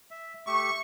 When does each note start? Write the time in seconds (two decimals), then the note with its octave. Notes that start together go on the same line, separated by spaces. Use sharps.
0.11 E5
0.47 A3 G4 E5 C#6